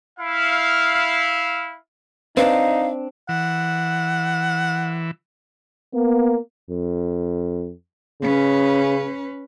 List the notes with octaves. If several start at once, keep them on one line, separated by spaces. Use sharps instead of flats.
E4 F5
C4 D4 D#4 B4 F5
E3 F#5
A#3 B3
F2
C#3 C#4 B4